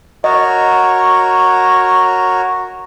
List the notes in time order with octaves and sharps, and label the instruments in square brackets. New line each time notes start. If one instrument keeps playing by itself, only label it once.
[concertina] F#4 A#4 C#5 [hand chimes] D#5